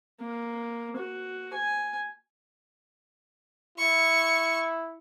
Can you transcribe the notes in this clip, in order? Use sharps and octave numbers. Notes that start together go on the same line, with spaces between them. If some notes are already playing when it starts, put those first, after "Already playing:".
A#3
F#4
G#5
E4 C#6